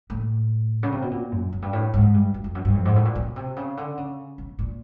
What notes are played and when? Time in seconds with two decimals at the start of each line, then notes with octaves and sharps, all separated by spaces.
0.10 A2
0.83 C#3
0.92 C3
1.02 B2
1.11 A#2
1.32 F#2
1.53 F#2
1.62 G2
1.73 A2
1.94 G#2
2.14 G2
2.34 F#2
2.44 F2
2.55 F#2
2.65 G2
2.75 F2
2.85 G#2
2.96 A2
3.05 A#2
3.15 B2
3.36 C3
3.57 C#3
3.77 D3
3.97 C#3
4.38 B2
4.59 A#2